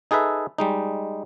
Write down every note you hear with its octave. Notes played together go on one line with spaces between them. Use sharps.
D#4 G#4 A4 B4 E5
G3 G#3 D#4